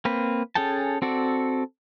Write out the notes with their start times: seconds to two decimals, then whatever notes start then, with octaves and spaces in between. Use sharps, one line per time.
0.05 A#3 C4 B4
0.55 C#4 G#4 A4 G5 A5
1.02 C4 F#4 A4 D5